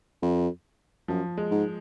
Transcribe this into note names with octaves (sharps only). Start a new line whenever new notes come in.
F2
F#2 F3
G#3
G#2